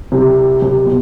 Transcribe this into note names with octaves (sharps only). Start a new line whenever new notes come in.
C2 C3
C2 C3
B2